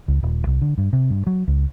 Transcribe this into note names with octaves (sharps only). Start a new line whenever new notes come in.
C#2
D#1
C2
D3
G2
C3
G2
F#3
C#2